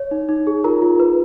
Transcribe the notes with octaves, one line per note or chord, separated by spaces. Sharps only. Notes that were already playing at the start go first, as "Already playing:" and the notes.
Already playing: C#5
D#4
D#4
G#4
F4 A#4 A#5
F4
B4